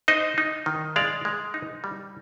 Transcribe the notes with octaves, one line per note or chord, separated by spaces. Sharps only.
D#4 C5 D#5
D#4
D#3
G#3 D5 F5
G#3
D#4
G3